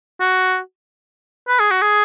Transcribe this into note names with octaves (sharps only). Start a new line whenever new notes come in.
F#4
B4
G#4
F#4
G#4